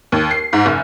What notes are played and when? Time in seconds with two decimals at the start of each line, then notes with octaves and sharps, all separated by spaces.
0.12 D#2
0.31 C7
0.53 G#2
0.66 F#1